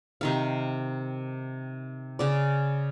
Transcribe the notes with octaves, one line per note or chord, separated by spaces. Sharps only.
C3 D#3 F5
C#3 D5